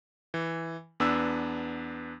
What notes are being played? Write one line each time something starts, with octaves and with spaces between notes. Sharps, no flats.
E3
E2 B3 D4 E6